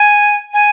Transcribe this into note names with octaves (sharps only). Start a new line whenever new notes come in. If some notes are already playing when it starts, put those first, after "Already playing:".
Already playing: G#5
G#5